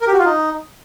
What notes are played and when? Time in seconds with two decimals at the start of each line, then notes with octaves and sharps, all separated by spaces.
0.01 A#4
0.07 G4
0.13 F#4
0.19 F4
0.25 D#4